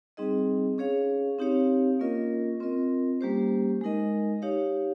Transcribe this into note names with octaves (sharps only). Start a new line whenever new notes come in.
G3 C4 D#4 G#4 D#5
C#4 G#4 C#5 F5
C4 D#4 G4 C#5 F5
A#3 C#4 F4 A#4 D#5
C4 F4 A#4 D#5
G3 A#3 C#4 G4 C5
G#3 D#4 A#4 D#5
D#4 G4 C#5 F5